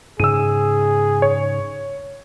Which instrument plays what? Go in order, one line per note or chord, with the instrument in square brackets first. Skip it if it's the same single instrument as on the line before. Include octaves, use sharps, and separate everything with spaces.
[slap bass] G#2 C#3 [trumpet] G#4 [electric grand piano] E6 D#7
[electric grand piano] C#5